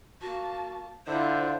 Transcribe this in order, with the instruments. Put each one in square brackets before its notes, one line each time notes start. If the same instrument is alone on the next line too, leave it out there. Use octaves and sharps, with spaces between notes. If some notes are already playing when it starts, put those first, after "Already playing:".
[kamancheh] A#3 A5 [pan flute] F#4
[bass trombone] D3 [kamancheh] E4 F4 [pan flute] C5